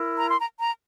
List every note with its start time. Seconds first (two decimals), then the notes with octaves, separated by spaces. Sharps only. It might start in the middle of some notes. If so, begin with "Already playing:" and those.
Already playing: E4 A#4
0.18 A#5
0.29 C6
0.40 A#5
0.59 A#5